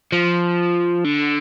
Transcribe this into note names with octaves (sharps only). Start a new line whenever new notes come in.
F3
D3